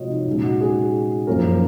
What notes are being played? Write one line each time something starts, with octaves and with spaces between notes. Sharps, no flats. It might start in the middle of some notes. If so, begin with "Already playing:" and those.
Already playing: C3 F3 G#3 F4 F#4 C#5 D#5
D#4
A#2 G#3 C#4 D#4
F#4
G#4
F#2 F3 A#3 C#4 A#4
A#4